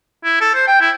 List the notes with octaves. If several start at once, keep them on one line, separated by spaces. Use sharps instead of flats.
E4
A4
C5
G5
E4